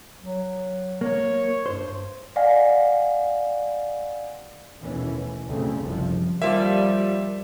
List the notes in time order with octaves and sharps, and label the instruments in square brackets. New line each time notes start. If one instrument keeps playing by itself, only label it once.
[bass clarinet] F#3
[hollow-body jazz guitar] A#3 [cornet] C#5
[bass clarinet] G2 [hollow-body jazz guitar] C5
[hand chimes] D5 D#5 F5 F#5 G#5 A#6
[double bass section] D#2 B2 E3 A3 C#4
D2 G2 C#3 A3 C4
F#1 C2 C3 F3
[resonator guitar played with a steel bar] F3 A#3 [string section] G3 [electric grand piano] E5